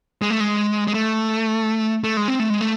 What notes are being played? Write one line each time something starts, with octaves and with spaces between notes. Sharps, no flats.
G#3
A3
G#3
G#3
A3
A3
G#3
C4
A3
G#3
A3